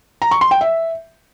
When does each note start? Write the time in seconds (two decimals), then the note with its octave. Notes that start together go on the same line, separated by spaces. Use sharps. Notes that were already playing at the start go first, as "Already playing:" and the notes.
0.22 A#5
0.31 C#6
0.41 C6
0.51 G5
0.61 E5